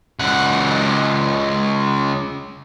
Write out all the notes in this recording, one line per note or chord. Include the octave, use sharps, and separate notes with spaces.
C#2 F#5